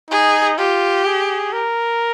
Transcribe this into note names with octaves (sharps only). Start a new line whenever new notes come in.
D#4 G#4
F4 G4
G#4
A#4